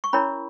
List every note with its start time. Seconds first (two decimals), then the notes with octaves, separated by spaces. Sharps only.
0.04 C#6
0.13 C#4 E4 A#4 C#5 B5